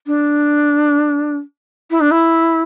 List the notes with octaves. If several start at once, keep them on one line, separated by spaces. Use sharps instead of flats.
D4
E4
D4
E4